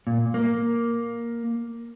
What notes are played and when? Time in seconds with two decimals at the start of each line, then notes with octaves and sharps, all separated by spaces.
0.07 A#2
0.34 A#3